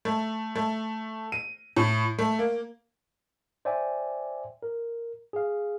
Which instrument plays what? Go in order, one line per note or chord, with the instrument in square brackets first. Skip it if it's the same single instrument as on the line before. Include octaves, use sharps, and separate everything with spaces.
[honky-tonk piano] A3
A3
D#7
A2
A3
A#3
[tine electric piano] C5 D5 E5 G5 G#5
A#4
G#4 F5